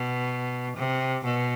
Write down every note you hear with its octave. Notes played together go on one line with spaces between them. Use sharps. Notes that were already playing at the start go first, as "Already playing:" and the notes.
Already playing: B2
C3
B2